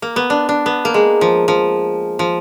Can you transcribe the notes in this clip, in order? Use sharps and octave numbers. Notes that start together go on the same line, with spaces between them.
A#3
B3
D4
D4
B3
A#3
G#3
F3
F3
F3